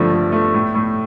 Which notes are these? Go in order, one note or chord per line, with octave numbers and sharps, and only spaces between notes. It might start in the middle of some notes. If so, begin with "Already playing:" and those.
Already playing: G2 D3 F3 A3
A3
A3
A2
A2